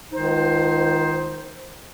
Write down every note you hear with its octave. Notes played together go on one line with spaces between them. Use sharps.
C#2 D#3 D#4 C5